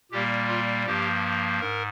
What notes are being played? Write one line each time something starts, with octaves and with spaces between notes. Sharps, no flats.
A#2 G3 A#3 G4
F4
G2 F3 A#3 G4
G#2 A#4